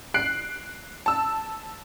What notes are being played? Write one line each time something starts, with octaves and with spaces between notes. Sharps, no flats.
F#6 C7 D7
A5 E6